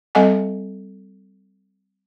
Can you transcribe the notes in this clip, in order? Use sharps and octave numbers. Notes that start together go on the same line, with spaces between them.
G3 C4 A4 D#5 F#5 G#5